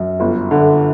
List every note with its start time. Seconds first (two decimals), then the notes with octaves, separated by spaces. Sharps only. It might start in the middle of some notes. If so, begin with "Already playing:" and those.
Already playing: F#2
0.20 G1
0.51 D3